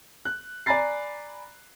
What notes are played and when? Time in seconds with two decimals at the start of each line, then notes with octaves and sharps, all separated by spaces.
0.25 F#6
0.66 D5 G#5 A#5 B5 A6 C7